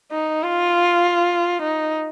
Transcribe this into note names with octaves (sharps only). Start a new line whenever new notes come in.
D#4
F4
D#4